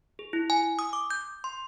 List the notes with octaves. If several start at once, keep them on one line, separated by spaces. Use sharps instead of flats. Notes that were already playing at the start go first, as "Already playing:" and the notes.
G#4
E4
G#5
D#6
D6
G6
C6